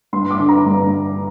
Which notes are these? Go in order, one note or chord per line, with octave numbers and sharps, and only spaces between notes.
G2 C6
D6
D3
A#5
G2